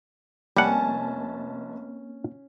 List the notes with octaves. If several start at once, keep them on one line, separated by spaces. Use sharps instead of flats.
F1 G3 A#3 C4 C#4 F#5 A5